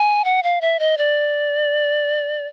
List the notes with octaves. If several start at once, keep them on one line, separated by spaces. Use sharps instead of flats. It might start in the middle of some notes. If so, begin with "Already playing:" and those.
Already playing: G#5
F#5
F5
E5
D#5
D5